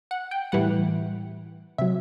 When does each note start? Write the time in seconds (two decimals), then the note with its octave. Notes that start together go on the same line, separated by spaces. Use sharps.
0.11 F#5
0.31 G5
0.52 A2 E3 G3 F#5
1.78 C3 F#3 E5